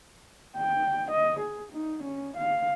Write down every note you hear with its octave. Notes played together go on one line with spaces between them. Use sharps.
G5
D#5
G#4
D#4
C#4
F5